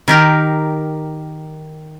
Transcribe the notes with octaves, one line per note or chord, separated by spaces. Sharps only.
D#3 G4 A#4